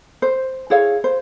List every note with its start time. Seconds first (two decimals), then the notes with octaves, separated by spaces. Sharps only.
0.22 C5
0.70 E4 G#4 C#5 F5
1.04 C5